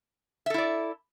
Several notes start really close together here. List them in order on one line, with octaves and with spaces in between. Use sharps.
E5 A4 E4 D5